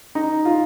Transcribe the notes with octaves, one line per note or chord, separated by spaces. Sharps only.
D#4
F4